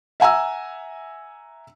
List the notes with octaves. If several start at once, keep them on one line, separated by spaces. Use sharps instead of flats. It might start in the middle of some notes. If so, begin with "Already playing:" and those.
E5 F#5 G#5 A#5 E6